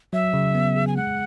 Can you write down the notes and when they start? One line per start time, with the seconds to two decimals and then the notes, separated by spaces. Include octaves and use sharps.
0.13 F#3 E5
0.34 C#3
0.55 B3
0.76 G#4
0.87 G#5
0.97 G#3 F#5